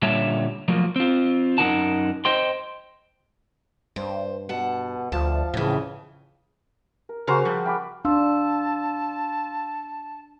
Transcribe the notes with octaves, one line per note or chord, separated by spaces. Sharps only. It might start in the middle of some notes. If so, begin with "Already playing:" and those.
A#2 D3 G3 C#5 E5 A5
F3 F#3 A3 A#3
C4 F4
F#2 E3 D#4 A#4 F#5 A5
C5 D#5 G5 C6
G2 C5
B2 F#5 A5
D2 F3 A5
F2 A2 C#3 E3
A#4
C#3 F#4 G#4 A#4 C5 A#5
F3 G3
G5 B5 D6
D4 F5 A5 C6 E6